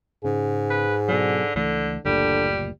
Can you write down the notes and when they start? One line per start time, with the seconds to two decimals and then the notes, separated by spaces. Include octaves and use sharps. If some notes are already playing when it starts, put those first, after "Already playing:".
0.25 G#2 C#3 G#4
0.70 B4
1.08 B2 D3 F#3
1.56 C#2 D3 E3 A3
2.05 F#1 D2 A#2 D3 G3